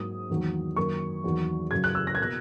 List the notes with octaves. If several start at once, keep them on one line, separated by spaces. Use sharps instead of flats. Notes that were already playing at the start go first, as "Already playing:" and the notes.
Already playing: G#2 F#3 A#3 D#6
E2 D#3 F#3 A#3
F#2 D#3 A#3 C#6
E2 D#3 F#3 A#3
F#2 C#3 F#3 G#6
F#6
E6
A#6
G#6
B2 A#3 F#6